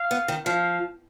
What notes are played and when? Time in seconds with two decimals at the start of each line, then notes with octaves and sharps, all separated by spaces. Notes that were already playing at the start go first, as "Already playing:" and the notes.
Already playing: F5
0.11 B3
0.28 D#3
0.46 F3 F5